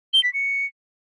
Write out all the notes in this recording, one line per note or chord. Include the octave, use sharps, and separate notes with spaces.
G7
B6
C#7